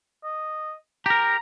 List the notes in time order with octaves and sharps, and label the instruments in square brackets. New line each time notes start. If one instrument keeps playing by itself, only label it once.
[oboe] D#5
[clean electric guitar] G4 A#4 [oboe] A#5